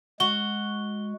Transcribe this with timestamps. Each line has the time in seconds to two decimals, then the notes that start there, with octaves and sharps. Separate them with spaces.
0.20 G#3 F#4 G7